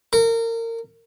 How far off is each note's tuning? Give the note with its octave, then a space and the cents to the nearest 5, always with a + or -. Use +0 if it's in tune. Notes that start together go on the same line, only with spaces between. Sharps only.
A#4 -30